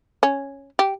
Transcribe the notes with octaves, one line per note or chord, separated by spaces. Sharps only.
C#4
G4